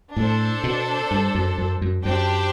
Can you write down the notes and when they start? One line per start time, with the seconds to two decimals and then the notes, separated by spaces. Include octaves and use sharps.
0.16 A2 D4 A4 C5
0.64 B2
1.11 G2
1.35 F#2
1.58 F#2
1.82 F#2
2.05 F#2 D4 G4 C5 G5